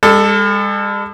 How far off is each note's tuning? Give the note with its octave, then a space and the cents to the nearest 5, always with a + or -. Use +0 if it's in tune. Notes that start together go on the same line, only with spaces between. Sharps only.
G#3 -45 A4 +5